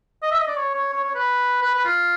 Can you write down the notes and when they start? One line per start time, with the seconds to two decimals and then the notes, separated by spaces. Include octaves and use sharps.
0.22 D#5
0.31 E5
0.39 D#5
0.48 D5
0.57 C#5
0.74 C#5
0.93 C#5
1.04 C#5
1.15 B4
1.62 B4
1.74 B4
1.85 F4